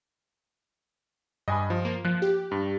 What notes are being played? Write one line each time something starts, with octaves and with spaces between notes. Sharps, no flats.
G2 D#5 G#5 B5
F3
A#3
F3 F#6
G4
G2